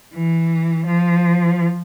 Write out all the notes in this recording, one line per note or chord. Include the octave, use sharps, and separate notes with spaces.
E3
F3